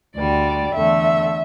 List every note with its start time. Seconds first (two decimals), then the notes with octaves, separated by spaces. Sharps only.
0.16 D2 D3 G3 D5
0.75 E2 D3 A3 E5